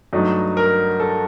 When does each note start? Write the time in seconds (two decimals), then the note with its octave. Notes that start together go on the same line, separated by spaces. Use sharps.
0.13 G2 F#3 A3 D#4
0.57 A#4
1.00 A4